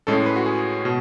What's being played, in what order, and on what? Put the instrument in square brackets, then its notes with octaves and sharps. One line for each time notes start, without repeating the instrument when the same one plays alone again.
[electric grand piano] A2 G#3 C#4 A4
B4
F#4
G#4
B2